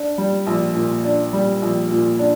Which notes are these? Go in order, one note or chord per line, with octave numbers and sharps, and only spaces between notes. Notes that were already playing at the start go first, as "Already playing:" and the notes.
Already playing: D4
G3
A#1
A#2
D4
G3
A#1
A#2
D4